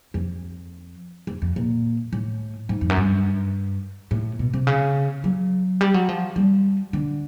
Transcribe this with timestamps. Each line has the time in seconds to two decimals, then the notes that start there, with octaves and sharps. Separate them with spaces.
0.14 F2
1.27 F2
1.42 F2
1.56 A#2
2.13 A2
2.69 G#2
2.81 F2
2.89 F#2
2.97 G2
4.11 A2
4.39 B2
4.53 C3
4.67 C#3
5.24 F#3
5.81 G3
5.94 F#3
6.09 F3
6.36 G3
6.93 D3